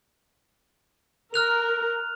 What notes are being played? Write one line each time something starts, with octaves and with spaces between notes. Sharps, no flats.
A#4 F6 F#6 F7